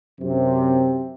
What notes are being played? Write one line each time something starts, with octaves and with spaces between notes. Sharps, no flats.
F#2 C3